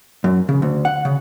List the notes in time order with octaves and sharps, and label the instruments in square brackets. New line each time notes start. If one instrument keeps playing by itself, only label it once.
[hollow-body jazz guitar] F#2
C#3
D2
F#5
C#3